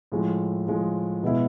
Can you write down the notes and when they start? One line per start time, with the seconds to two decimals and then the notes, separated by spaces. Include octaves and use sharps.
0.12 A2 F3 G#3
0.66 A2 F3 G#3
1.23 B2 G#3 B3 E4